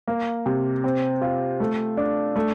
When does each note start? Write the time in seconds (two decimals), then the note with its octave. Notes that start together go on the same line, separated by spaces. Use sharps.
0.08 A#3
0.46 C3
0.84 C4
1.21 F4
1.60 A3
1.97 D4
2.36 A3